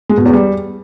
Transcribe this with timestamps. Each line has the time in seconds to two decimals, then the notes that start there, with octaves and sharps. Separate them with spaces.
0.09 G#3
0.17 B2
0.25 E2
0.33 G3